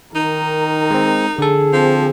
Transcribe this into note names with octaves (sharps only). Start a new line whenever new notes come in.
D#3 D#4 A#4
G#3 C4
D3 G#4 A4
F3 C4